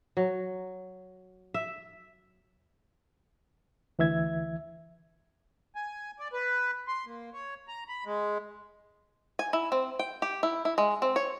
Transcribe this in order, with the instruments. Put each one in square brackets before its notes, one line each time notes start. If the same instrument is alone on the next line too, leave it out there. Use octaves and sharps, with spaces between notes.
[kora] F#3
E5
[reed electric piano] D2 E3 E5 G#6
[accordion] G#5
D5
B4
C6
A#3
C#5
A#5
B5
G#3
[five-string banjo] G#5
E4
C4
G5
G4
E4
E4
G#3
C4
C#5